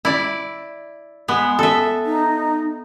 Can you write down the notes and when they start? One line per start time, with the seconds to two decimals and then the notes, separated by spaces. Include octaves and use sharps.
0.05 E4 D5
1.28 G#3 B3
1.59 A4 E5
2.06 D#4